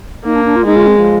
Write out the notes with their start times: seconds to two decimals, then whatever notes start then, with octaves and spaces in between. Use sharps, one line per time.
0.25 A#3 D#4
0.35 D4
0.45 D4
0.56 F4
0.66 G#3 D#4
0.76 F4
0.86 C4
0.97 F3